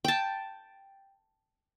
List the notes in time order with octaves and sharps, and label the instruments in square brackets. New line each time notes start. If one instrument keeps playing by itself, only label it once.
[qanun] G5 A5